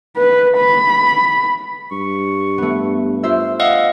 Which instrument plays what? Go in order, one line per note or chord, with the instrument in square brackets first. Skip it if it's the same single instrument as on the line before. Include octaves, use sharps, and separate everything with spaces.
[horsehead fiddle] B4
B5
[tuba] G2 [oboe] C#6
[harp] A3 B3
[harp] F4 C5 E5 [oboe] E6
[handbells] D#5 F5 F#5 [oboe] E6